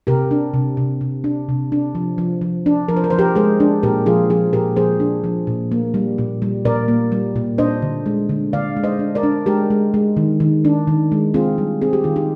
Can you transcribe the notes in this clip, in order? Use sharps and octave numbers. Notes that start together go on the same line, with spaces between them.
C3 G4 A#4
D4
C3
C3
C3
D4
C3
D4
F3
F3
F3
D4
F3 A#4
C5
A#4
F3 C5
G4 A#4
G#3 G#4 C5
D4
A#2 G4 A#4
F3 F4 G#4
F3 F4 G#4
A#2 G4 A#4
F3 G#4 C5
D4
F3
A#2
A#3
G3
A#2
G3
A#2 A#4 D5
A#3
G3
A#2
D4 C5 D#5
D3
G#3
D3
D3 D5 F5
G#3
C5 D#5
D4
A#4 D5
D4
G#3 G4 A#4
G#3
G#3
D#3
D#3
D4
D#3
G#3
C4 F4 G#4
G3
C4 G#4
G4
D#3 F4
D#4 G4